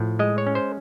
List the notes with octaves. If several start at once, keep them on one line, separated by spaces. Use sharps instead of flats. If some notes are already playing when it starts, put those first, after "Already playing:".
Already playing: A2 F3
G#3 D#5
C#5
C#4
C5